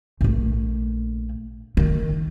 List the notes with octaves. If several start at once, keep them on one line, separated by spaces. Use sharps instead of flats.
A#1 A3
D#3